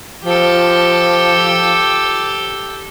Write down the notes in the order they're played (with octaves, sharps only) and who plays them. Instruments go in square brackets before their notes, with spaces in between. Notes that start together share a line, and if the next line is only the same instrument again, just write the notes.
[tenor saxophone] F3 [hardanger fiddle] G4 A4